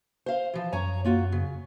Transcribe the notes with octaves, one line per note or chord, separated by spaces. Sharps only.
C5 F5
E3 F3
F#2 C#5 G#5 A#5
A#3 F4 F#4
C#3